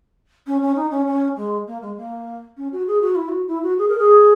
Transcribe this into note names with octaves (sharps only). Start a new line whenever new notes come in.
C#4
C#4
D#4
C#4
C#4
G#3
A#3
G#3
A#3
C#4
F#4
G#4
F#4
E4
F#4
E4
F#4
G#4
A#4
G#4